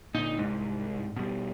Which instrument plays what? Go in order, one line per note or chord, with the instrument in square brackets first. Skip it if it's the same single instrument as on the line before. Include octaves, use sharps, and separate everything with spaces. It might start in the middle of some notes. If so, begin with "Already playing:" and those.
[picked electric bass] A#2 D3 [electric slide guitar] D#4
[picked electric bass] C2 [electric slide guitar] G#2
[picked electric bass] B2 G3